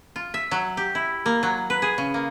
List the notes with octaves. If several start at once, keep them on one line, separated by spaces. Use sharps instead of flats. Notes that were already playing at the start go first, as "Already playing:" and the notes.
F4
E5
F#3
G4
E4
A#3
F#3
B4
G#4
C#3
A#3